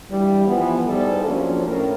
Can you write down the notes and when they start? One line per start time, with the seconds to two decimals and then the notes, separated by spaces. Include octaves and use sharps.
0.10 G2 E3 G3
0.47 E3 F3 B3
0.86 E2 G#2 G3 G#3 A4
1.25 F3 F#3 A#3 C#4 D4
1.65 A2 C#4 A#4